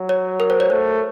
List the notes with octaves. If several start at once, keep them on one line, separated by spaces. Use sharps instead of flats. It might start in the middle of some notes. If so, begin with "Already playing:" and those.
Already playing: F#3
C#5
A#4
C5
C#5
A3 C5